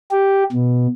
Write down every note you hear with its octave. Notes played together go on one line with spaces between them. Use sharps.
G4
B2